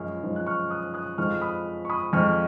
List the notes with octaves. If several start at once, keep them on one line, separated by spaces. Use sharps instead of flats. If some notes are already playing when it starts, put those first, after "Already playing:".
Already playing: F#2 F3 G#3 C#6 F6
F#2 F3 G#3
F#6
C#6 F6
D#6 F#6
D#6 F#6
F2 F3 G#3 C#6 F6
B5 D#6
C#6
B5 D#6
F2 F3 G#3 C#6 F6